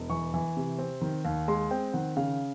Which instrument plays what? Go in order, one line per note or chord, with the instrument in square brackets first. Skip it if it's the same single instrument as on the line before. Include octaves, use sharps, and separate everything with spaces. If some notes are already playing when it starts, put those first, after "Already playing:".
Already playing: [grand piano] E1
E3 C#6
E3
C3
C4
D#3
D#2
G#3 C6
C4 G5
D#3 F#5
C#3 F5